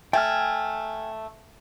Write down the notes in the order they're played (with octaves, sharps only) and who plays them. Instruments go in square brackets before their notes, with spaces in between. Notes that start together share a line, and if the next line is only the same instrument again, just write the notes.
[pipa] A3 [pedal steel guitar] G5 G#5 F6